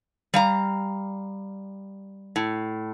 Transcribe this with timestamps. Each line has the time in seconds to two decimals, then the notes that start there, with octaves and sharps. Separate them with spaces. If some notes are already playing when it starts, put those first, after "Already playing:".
0.34 G3 F5 A#5
2.36 A2